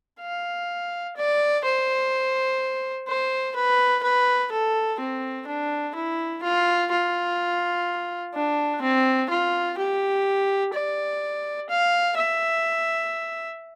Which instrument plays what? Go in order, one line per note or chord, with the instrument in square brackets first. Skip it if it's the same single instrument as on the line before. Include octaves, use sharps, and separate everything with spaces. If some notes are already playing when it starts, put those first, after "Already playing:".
[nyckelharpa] F5
D5
C5
C5
B4
B4
A4
C4
D4
E4
F4
F4
D4
C4
F4
G4
D5
F5
E5